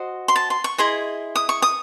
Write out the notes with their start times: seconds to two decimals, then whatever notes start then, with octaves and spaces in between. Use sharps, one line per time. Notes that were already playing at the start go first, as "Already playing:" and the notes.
Already playing: F#4 C5 D#5
0.28 C6
0.36 A5
0.50 C6
0.64 C#6
0.78 E4 G#4 D#5 C6
1.36 D#6
1.49 C#6
1.62 D#6